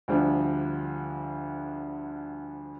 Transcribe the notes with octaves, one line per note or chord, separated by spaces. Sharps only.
D2 D3 F3 G3